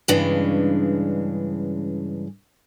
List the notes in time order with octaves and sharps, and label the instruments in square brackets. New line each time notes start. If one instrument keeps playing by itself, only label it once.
[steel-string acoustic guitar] G2 C#3 E3 G#3 C#4 D4